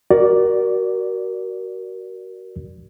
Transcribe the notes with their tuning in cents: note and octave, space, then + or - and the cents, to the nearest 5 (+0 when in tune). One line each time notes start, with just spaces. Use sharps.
F#4 +25 A#4 +15 D5 +0